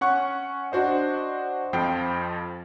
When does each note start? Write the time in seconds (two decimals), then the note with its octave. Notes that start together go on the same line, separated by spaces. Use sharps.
0.01 C#4 F#5 C#6 F#6
0.72 D4 F#4 C5 D#5
1.73 F2 F3 G5 C7